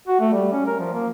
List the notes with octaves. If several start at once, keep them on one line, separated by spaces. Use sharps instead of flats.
F#4
A3
G3
C#4
A#4
F3
A#3